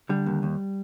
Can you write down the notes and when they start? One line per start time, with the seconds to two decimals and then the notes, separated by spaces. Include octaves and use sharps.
0.09 D3 G3
0.26 D#2
0.43 D#2